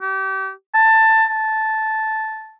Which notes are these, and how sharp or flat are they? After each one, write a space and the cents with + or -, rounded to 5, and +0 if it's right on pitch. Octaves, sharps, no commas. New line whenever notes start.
G4 -30
A5 +15
A5 -10